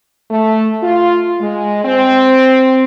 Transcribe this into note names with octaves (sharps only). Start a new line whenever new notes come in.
A3
F4
G#3
C4